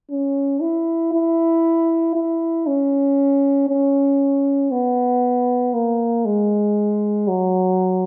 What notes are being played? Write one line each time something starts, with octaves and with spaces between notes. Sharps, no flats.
C#4
E4
E4
E4
C#4
C#4
B3
A#3
G#3
F#3